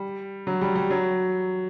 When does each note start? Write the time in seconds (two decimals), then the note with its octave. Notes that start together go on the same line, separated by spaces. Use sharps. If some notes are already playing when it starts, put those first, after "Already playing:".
Already playing: G3
0.47 F#3
0.61 G3
0.75 G3
0.90 F#3